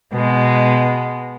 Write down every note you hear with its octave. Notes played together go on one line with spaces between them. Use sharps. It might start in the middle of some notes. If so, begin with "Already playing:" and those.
B2 G#3 B3